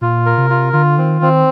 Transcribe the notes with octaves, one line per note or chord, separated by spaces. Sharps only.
A#2 F4
A#4
C3
F4
D3 F4
D#3 C4
D#3 C4